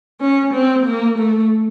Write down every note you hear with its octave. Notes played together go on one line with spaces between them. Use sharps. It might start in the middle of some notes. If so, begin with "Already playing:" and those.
C#4
C4
A#3
A3